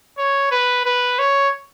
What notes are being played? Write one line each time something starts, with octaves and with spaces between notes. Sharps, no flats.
C#5
B4
B4
C#5